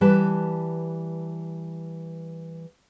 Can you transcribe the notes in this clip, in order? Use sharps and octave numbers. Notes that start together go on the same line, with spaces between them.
E3 G3 B4 A5